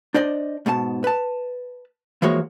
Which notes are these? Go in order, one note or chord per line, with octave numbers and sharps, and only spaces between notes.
D4 C5 D5 D#5
G#2 B2 A#4 A5
B4 A5
E3 F3 G#3 A#3 F#4 C#5